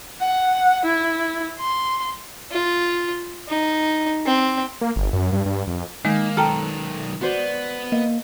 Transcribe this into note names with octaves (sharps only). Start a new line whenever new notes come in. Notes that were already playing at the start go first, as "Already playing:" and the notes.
F#5
E4
C6
F4
D#4
C4
A#3
G1
F#2
G2
G2
F2
D#3 G#3 A#3 D#4
B1 D#3 A4 G5 A#5 F6
B3 F#4 C5 D5
A#3 D#5